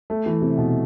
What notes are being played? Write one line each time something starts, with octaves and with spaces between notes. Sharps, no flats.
A3
E3
C3
B2